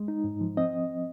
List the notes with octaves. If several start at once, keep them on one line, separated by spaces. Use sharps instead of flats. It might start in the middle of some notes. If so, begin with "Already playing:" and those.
Already playing: G#3
D#4
G#2
F3
C4 D#5